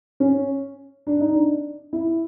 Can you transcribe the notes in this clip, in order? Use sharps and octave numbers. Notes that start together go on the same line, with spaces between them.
C#4
D4
D#4
D4
E4